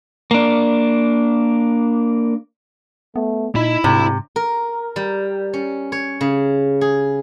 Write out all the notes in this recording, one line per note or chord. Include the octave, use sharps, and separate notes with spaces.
A#3 D4
A3 B3
A#2 D#4 E4 B5
D2 G#2 C3
A#4
G3
C#4
C#5
C#3
G#4